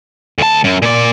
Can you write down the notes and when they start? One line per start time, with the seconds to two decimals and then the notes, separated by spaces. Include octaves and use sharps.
0.38 D2 A5
0.64 F#2
0.82 A#2 D5